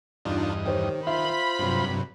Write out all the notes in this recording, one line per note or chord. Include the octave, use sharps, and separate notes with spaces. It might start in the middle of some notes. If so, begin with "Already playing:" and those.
E2 G2 D4 D#4 F4 D#5
D#3 G4 C5 C#5
F4 C5 E5 B5
G2 C3 F#3